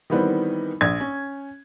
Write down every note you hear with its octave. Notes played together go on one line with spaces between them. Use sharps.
D#3 E3 G3 B3 C4
A#1 G#6
C#4